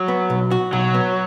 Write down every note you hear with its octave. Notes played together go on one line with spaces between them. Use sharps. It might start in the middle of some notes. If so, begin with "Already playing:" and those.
Already playing: F#3
B3
B1
F#4
B1 F#3
B3